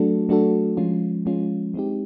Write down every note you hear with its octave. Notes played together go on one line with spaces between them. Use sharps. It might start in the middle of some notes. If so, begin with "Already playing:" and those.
Already playing: F#3 A3 D4 F#4 A4
F#3 A3 D4 F#4 A4
F3 G#3 C#4 F4
F3 G#3 C#4 F4
G#3 C4 D#4 G4